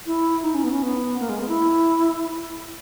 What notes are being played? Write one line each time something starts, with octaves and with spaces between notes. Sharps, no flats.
E4
D#4
C#4
B3
C#4
B3
A#3
G#3
B3
E4